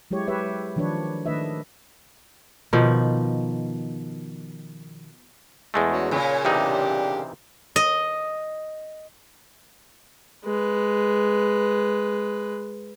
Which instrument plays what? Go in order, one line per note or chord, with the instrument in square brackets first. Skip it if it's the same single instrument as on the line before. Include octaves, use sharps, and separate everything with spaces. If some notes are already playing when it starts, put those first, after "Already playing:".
[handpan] F#3 G#3 E4 G4 C#5
G4 B4 C#5 E5
D#3 F3 D4 B4 C#5
D#3 A3 D4 B4 D#5 E5
[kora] B2 D#3 F3
[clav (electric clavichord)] E2 G#3 A3
[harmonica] C#4 F#4
[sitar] A#2 C#3 [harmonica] C#5 G#5
[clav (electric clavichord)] C3 E3 D#4 [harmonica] D4 G4
[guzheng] D#5
[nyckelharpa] G#3 B4